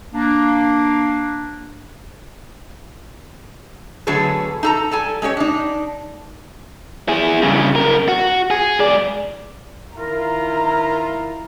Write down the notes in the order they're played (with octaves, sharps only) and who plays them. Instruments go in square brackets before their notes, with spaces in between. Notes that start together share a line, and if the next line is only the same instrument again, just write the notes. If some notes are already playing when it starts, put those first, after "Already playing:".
[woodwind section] A#3 D4
[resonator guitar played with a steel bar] D3 F#3 A3 B3 G#4 A4
D#4 A4 A#5
G3 A4 G#5
G#3 C#4 G4 C#5
D4 D#4
[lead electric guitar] E4 G#4
G2 C#3
C#3 A#4
F#4
G#4
G#2 D5
[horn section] D#3 E4 F4 [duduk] A#4 [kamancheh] A#5